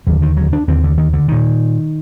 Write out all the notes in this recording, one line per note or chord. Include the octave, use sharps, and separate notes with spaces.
D#2 D3 F#3
D#3
F#3
D4
D#2 D3 C4
D3
D#3
D3
A#2 D#3